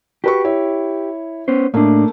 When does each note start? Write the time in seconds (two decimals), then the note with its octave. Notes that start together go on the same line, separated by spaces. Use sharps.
0.24 F#4 G4 B4 C#6
0.45 E4 C#5
1.48 B3 C#4 C5
1.74 A2 A3 A#3 D4